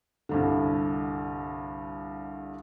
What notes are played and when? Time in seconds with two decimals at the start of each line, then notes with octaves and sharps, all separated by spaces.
0.29 C2 G2 D3